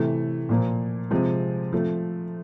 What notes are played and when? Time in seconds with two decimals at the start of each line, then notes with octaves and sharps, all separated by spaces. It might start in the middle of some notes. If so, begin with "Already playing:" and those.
Already playing: C3 E3 A3
0.49 A#2 F3 A#3
1.11 C3 F3 G#3 C4
1.73 F3 A3 C4